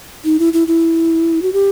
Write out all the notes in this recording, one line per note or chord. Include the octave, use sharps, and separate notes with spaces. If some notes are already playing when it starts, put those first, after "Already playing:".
D#4
E4
E4
E4
F#4
G4